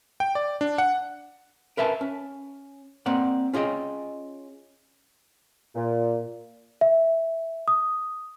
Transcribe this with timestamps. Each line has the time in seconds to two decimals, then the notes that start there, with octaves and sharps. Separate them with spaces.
0.20 G5
0.35 D5
0.61 D4
0.78 F#5
1.77 A#4 B4 E5 G#5 A5
2.01 C#4
3.06 A#3 C4 D5 F#5
3.54 C#4 F4 G#4 D#5 G5
5.75 A#2
6.81 E5
7.68 D#6